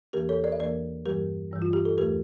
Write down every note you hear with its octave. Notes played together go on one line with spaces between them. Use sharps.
E2 E3 A#3 G4 A#4
A4 C#5
A#4 D5
E5
E2 E3 A#3 A#4 D5
G2 E3 G3 G4 A#4
G2 E3 G3
F4
G4
A4
E2 E3 A3 G4 A#4